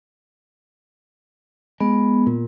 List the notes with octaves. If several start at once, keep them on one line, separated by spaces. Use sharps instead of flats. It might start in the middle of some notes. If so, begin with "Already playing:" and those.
G#3 B3
A#2